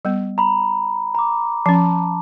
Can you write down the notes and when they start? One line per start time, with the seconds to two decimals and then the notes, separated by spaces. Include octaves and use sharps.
0.05 G3 B3
0.38 A#5 B5
1.15 A#5 D6
1.66 F3 C#4 A5